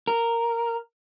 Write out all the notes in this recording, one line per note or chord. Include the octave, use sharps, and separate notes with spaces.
A#4